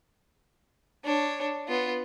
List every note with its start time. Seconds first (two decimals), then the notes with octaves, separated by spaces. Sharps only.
1.04 D4 C#5
1.68 B3 F4